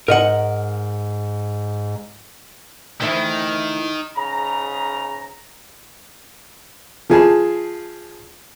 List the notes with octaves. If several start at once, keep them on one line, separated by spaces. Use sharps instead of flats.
G#2 A#4 D#5 F#5
D2 D#3 E3 E4
G#2 C#3 A#5
F3 G#4 A5